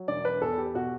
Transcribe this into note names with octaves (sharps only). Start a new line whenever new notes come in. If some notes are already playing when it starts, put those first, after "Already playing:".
Already playing: F#3
E1 D5
B4
E2 A4
G4
B2 F#4